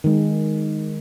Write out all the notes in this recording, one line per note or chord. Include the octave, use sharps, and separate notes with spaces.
D#3 G#3